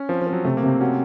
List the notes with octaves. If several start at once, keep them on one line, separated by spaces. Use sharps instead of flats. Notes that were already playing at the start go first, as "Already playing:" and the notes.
Already playing: C#4
F3 C4
F3
C4
F#3
C3 A3
A#3
C3
C4
C#4 F#4